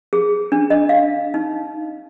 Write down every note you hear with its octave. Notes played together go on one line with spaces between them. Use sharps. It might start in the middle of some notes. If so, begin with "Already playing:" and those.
G#4
D4
D#5
F5
D#4